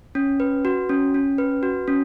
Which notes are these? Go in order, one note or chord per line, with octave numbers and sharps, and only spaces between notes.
C#4
B4
F#4
C#4
C#4
B4
F#4
C#4